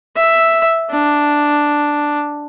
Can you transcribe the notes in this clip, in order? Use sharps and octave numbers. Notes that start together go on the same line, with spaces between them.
E5
D4